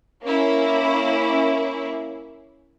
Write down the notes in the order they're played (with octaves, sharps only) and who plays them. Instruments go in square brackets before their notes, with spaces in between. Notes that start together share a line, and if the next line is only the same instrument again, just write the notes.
[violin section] A#3 C#4 E4